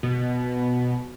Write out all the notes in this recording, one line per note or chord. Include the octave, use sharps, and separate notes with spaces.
B2